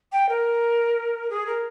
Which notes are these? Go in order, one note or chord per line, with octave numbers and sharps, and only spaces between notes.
G5
A#4
G#4
A#4